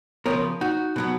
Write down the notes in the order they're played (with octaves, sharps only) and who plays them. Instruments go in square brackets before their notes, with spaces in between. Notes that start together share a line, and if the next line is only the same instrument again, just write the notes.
[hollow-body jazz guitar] C#3 F3 B3 A#4 C#5
D#4 F#4
B2 F#3 B3